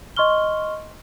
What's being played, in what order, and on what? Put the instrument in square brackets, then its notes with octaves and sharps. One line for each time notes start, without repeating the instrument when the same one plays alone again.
[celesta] D#5 C6 C#6 F6 G7